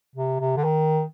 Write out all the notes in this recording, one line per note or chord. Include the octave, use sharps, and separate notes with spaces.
C3
C3
D3
D#3